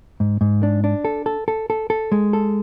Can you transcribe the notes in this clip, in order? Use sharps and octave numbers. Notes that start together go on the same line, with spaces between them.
G#2
G#2
D4
D4
A4
A4
A4
A4
A4
G#3
A4